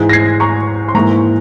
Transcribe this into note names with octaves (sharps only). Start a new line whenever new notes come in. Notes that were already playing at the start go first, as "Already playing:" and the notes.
Already playing: G#2 E3 G#3
A#6
G#6 C7
A#5 C#6
C6
G#2 E3 A#3 A#5 C#6